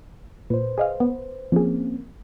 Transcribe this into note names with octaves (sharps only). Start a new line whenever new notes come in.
A#2 B4 C5
G#4 D#5 F5
B3
F3 A#3 C4 C#4 G#4